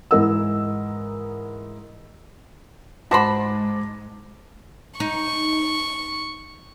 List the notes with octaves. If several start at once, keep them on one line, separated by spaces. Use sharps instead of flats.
G#2 E3 A#4 D#5 F#5 E6
G#2 G#3 F#4 C5 A5 B5 D6 A#6
D#4 C#6